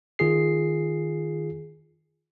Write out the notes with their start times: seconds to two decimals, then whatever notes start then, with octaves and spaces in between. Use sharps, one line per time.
0.19 D#3 F4 G#4 C7